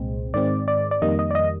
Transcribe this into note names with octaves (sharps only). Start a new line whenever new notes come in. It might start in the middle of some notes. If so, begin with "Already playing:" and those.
Already playing: C2 A#2 G#3 C4
G#2 D#3 G#3 C4 D5
D5
D5
F2 D#3 G3 A#3 D#5
D#5
D5
D#5